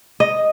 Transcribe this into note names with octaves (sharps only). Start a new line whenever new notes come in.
D#5